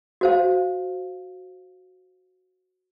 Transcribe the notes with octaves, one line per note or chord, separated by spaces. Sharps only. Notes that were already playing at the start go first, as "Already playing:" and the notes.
F#4 C5 F5